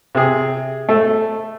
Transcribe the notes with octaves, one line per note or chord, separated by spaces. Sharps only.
C3 G#4
A3